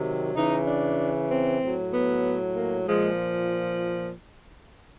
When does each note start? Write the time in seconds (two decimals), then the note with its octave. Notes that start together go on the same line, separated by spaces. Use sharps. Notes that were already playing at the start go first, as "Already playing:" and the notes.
Already playing: C3 D#3 F#3
0.35 C#3 E3 D#4
0.67 D4
1.30 C4
1.61 A2 F#3
1.93 B3
2.56 A#3
2.87 A#2 F3 G#3